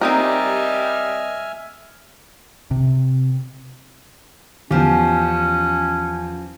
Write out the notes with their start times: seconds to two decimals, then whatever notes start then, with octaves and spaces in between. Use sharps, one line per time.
0.01 G3 C4 D#4 A#4 D#5 E5 G#5 F6
2.71 C3
4.71 E2 F3 C#4 G4